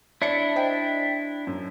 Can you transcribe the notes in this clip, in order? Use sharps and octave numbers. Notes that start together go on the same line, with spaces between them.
D4 E4 D5 C#7
C5 D#5 G5
F#2